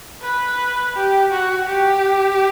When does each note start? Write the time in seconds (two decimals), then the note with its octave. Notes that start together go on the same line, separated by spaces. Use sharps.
0.22 B4
0.96 G4
1.32 F#4
1.69 G4